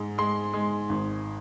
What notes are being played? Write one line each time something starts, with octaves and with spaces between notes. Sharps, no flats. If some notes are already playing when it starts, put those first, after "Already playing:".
Already playing: G#2 G#3
G#3 C6
G#3
G#1